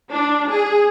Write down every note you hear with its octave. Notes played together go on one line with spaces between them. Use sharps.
D4
G#4